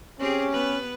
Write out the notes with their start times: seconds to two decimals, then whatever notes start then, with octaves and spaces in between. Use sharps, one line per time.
0.19 C4 C#4 G4 G#4
0.52 B3 B4